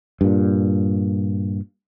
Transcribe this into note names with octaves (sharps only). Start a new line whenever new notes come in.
G2 A#2